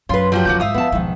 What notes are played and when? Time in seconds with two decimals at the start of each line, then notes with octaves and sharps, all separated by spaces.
0.09 F#2 C#4 F4 B4 C6
0.32 F3 F#3 C4 F#4 G4
0.45 F2 C#3 F#4 D6 G6
0.60 G#2 E5 F5 D#6
0.74 F3 B3 A5
0.92 B1 G#2 D#3 F3